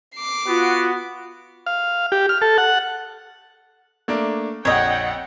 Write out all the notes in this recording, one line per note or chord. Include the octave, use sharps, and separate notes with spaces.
D6 C7
B3 F4 F#4
F5
G4
F6
A4
F#5
A3 A#3 D4
A#1 F2 C#5 D#5 F#5 G5